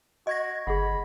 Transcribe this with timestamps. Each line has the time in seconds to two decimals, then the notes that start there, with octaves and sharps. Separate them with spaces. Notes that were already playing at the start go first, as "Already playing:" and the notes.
0.27 F#4 D#5 G#6 A#6
0.67 G1 G#4 F#5 B5